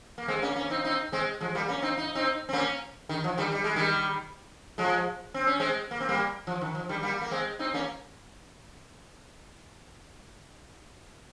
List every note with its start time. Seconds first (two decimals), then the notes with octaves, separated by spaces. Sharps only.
0.18 A#3
0.28 G#3 C4
0.42 A#3 C#4
0.56 A#3 C#4
0.70 C4 D#4
0.84 C4 D#4
1.12 G#3 C4
1.41 F3 G#3
1.55 G3 A#3
1.68 A#3 C#4
1.82 C4 D#4
1.98 D#4
2.15 C4 D#4
2.49 C4
2.53 A#3 C#4
3.09 D#3
3.24 F3
3.37 D#3 G3
3.52 G3
3.64 G#3
3.76 D#3 G3
4.78 F3 G#3
5.34 C4
5.47 C#4
5.60 G#3 C4
5.91 A#3
6.00 C4
6.09 G3 A#3
6.47 F3
6.61 D#3
6.75 F3
6.89 D#3 G3
7.03 G3 A#3
7.22 A#3
7.31 G#3 C4
7.59 C4 D#4
7.74 A#3 C#4